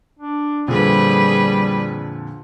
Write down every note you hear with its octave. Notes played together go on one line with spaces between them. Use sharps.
D4
F2 A#2 D3 G3 G#4 B4